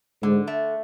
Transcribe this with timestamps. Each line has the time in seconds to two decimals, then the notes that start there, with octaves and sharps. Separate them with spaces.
0.22 G#2 D3
0.47 A3